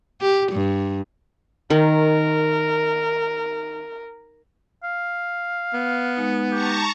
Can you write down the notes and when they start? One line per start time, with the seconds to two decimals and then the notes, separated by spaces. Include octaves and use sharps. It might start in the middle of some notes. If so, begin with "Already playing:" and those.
0.21 G4
0.52 G2
1.70 D#3 A#4
4.84 F5
5.73 B3
6.17 G#3 D#4
6.52 G4 A5 A#5 C#6